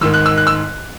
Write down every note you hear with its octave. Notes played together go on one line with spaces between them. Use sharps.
G#1 G#2 D#3 E6
F#6
E6
F#6
E6